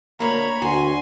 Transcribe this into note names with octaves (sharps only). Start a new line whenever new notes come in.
D2 A#3 C#5 A#5 B5
D2 F#4 G#5 C6